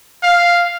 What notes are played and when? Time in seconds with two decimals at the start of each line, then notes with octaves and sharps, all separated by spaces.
0.23 F5